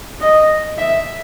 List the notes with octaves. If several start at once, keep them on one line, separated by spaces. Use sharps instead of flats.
D#5
E5